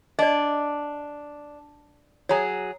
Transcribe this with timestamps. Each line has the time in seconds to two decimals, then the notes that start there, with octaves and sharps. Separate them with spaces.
0.19 D4 D5 D#5
2.29 F#3 G#4 C#5 A#5